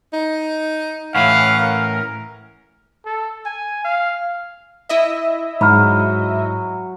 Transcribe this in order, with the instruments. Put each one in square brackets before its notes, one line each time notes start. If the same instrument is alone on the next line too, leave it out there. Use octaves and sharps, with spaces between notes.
[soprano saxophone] D#4
[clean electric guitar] A2 E3 C#4 [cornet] F5 [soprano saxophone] F#5
[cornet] A#4
A4
G#5
F5
[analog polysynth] E4 D#5 E5
[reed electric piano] G#2 [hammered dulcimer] F#3 [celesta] B5 F6